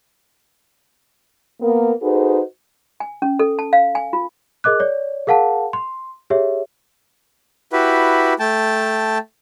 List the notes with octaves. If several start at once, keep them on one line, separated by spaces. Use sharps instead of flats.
A#3 B3 A#4
D#4 F#4 G#4 A4 B4 C5
G#5
C#4
A4
A5
F5
G#5
F4
G#4 A#4 D#5 D6 F#6
C#5 D5
G#4 A#4 F5 F#5 A5
C6
G4 G#4 C#5 E5
E4 F#4 G4 B4
A3 G5 A5